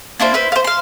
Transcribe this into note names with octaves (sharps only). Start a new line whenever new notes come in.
A#3 D4 E4 C5
E4 B4 C5
C5 F5
F5 C6